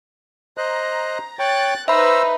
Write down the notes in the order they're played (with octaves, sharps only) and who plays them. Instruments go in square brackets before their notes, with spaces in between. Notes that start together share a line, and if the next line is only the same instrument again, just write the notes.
[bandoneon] C5 D#5 F#6 [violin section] A#5
[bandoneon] C#5 G5 [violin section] F#6 A6
[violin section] D#4 B4 [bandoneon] C5 E6 [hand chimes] E5 B5